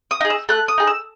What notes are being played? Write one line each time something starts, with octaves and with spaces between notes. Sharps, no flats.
D#6
D#4 G#4
E6
A3 F#6
D#6
D#4 G#4
E6